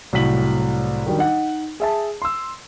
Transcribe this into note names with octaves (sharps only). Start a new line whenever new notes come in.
C2 A2 F#3 B6 F#7
D#3 F#3 G3 D4
D#4 F#5
G#4 E5 A5
C6 E6